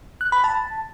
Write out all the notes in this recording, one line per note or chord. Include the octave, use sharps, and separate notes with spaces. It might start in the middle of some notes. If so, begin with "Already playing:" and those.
F#6
B5
A5